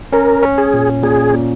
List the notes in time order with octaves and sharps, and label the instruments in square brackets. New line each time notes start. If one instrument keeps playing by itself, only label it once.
[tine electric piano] C#4 [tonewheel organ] A#4
[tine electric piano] C#4
[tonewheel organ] G#4
[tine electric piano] A#2
[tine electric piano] A#2 [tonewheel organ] G#4
[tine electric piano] A#2